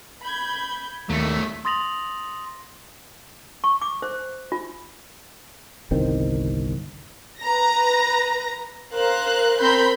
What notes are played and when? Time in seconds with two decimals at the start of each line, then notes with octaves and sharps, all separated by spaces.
0.22 B5 G6 G#6
1.09 D#2 F#3 A3 B6
1.65 C6 D#6 A6 A#6 F7 F#7
3.64 C#6
3.81 D6
4.02 C5
4.52 F4
5.91 G1 C2 D#3 C4
7.41 B4 A#5 A#6
8.93 A#4 C5 F5 F#6
9.60 C4 A#4 B5 C6 G6